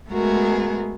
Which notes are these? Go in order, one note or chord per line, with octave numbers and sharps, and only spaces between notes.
G#3 A3 B3 F#4 G#4 A#4